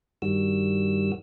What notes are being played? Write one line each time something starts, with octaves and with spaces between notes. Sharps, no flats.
G2 D#3 G3 F#4 E6